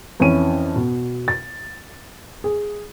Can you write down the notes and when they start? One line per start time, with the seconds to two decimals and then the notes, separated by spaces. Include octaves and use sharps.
0.20 F2 E3 C#4 D#7
0.76 B2
1.28 A6
2.44 G#4